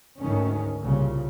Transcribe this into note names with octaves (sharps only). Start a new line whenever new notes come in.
D2 G#2 D#3 C#4
C2 A#2 C#3